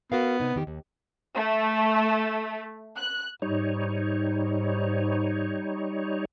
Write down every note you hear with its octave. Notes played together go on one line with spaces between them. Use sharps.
B3 F#4 A#4 F5
C3 D#4
E2 D#3 G4
D#2
A3
F#6
G#2 G3 D#4 C#5